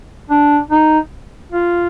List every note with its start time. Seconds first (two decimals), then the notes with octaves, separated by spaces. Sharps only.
0.30 D4
0.71 D#4
1.52 F4